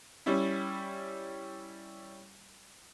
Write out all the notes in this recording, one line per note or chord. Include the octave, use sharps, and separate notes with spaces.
G3 C#4 E4